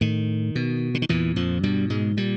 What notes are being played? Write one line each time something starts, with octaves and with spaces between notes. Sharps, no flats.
A2 D#3
B2
D3
D#3
E2 A#2 E3
F2 F3
G2 B2 G3
G#2 G#3
A#2 G3